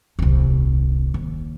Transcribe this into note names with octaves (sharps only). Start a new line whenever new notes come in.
D#1 C2
D#2